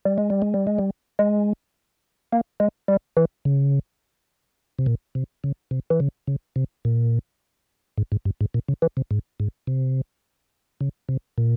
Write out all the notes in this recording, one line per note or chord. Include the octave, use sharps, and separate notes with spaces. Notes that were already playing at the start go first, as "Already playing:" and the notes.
G3
G#3
G3
G#3
G3
G#3
G3
G#3
A#3
G#3
G3
E3
C#3
C3
A#2
C3
C#3
C3
E3
C#3
C#3
C3
A#2
G#2
G#2
G2
G#2
A#2
C#3
E3
C3
G#2
G#2
C3
C#3
C3
A#2